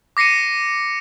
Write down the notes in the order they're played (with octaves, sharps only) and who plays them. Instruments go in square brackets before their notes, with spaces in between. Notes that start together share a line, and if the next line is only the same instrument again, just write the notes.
[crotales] D6 A#6 C7 C#7 D#7